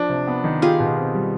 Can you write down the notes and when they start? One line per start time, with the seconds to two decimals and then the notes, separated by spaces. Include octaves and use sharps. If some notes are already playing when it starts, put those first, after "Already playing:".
Already playing: F3 D4
0.10 C3
0.27 B3
0.44 D#3
0.62 F4 G4 G#4
0.80 B2
0.97 C4
1.14 G3